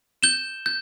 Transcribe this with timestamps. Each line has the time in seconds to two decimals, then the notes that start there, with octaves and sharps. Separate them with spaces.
0.23 G6 E7 G7
0.66 G6